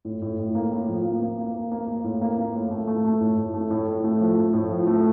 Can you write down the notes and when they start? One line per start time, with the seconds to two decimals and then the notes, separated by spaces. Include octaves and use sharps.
0.05 A2
0.22 A2
0.38 A2
0.55 A#3
0.71 A2
0.88 F3
1.05 A#3
1.21 A#3
1.38 A#3
1.54 A#3
1.72 A#3
1.87 A#3
2.04 A2
2.21 A#3
2.38 A#3
2.54 A2
2.71 A3
2.87 A3
3.05 A3
3.21 A2
3.38 A2
3.54 A3
3.70 A2
3.88 A2
4.04 A3
4.20 F3
4.37 A3
4.53 A2
4.71 F3
4.87 A3